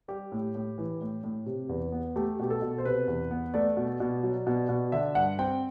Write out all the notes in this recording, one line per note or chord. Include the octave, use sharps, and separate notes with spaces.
G3 G4
A2
A2
E3
A2
A2
C3
E2
B3
A3 G4
B2 G4
A4
B2
C5
C3 B4
E2
B3
A3 D5
B2
B2
F#3
B2
B2
D3 E5
G2 F#5
C4 G5